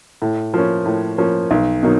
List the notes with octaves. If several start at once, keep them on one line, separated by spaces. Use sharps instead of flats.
A2
F3 A#3 C#4
A2
F3 A#3 C#4
B1
B2 F#3 A#3 D#4